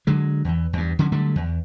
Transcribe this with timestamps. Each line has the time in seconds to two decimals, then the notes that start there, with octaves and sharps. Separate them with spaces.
0.07 D3 F#3 G#3
0.45 E2 E3
0.73 E2 G2
0.99 D3 F#3 C#4
1.12 D3 F#3 G3 A3
1.36 E2